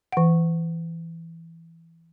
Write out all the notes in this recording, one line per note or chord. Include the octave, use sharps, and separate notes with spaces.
E3 F#5